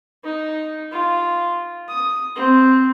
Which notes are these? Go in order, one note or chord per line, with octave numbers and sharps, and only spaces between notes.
D#4
F4
D#6
C4